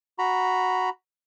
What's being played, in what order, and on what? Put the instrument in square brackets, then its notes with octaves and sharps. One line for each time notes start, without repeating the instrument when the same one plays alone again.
[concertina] F#4 A#5 B5